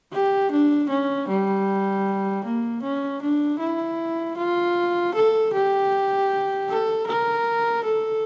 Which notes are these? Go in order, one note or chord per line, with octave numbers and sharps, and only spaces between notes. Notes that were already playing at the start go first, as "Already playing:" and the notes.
G4
D4
C#4
G3
A#3
C#4
D4
E4
F4
A4
G4
A4
A#4
A4